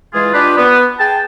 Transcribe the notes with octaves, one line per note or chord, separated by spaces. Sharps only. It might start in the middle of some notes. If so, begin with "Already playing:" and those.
E3 G#3 F4 G#4
D4 F4 G4 B4
B3
G#4 G5 A5